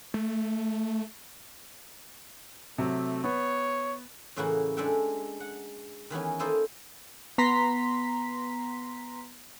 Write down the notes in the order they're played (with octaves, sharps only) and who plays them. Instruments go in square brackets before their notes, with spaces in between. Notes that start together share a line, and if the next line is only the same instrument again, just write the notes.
[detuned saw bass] A3
[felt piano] C3 F#3 [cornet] A3
[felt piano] B3 [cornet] C#5
[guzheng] A2 C#3 E3 A#3 E4 F#4
G#3 D4 A4 E5 F#5 G5
F#5
D#3 E3 B3 C#4
A#3 D#4 E4 A4 C5 D#5
[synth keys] B3 A#5 C6 B6